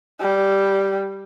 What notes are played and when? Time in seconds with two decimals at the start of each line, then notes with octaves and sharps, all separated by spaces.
0.21 G3